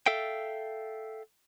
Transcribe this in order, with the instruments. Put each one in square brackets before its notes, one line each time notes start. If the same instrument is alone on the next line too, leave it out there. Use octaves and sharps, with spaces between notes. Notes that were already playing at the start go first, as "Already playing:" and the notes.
[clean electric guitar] A4 E5 F5 G5